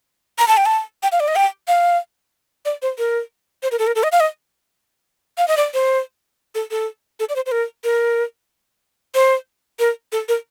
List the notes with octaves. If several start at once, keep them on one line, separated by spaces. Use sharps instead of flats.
A#5
A5
G5
A5
G5
F5
D5
D#5
G5
F5
D5
C5
A#4
C5
A#4
A4
A#4
A4
D#5
F5
D#5
F5
D#5
D5
C5
A4
A4
A4
D5
C5
C5
A#4
A#4
C5
A#4
A4
A#4